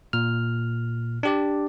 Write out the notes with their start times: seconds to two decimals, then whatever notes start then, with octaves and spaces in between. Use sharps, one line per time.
0.13 A#2 F6
1.23 D4 G4 D5